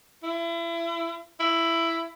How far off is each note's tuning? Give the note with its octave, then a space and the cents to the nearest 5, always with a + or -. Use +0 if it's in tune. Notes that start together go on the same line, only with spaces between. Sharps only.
E4 +35
E4 +10